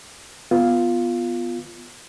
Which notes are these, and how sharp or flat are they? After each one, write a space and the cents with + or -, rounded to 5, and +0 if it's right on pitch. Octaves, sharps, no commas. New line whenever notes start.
B3 +0 F4 +0